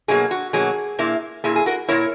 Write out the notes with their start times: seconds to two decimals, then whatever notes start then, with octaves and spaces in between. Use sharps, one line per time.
0.08 B2 F#3 A#3 G#4
0.31 F#4
0.53 B2 F#3 A#3 G#4
0.99 A#2 A#3 E4
1.44 A#2 A#3 E4 G#4
1.56 G#4
1.66 F#4 A#4
1.88 A#2 A#3 E4 A#4 C#5